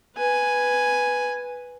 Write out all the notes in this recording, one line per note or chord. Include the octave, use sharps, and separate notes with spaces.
B4 G#5